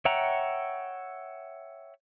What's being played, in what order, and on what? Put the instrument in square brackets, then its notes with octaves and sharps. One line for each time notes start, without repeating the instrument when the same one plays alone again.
[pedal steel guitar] C#5 E5 F#5 G5 A#5